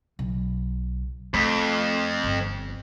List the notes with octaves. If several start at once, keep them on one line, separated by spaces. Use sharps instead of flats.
B1
F2 A3
G1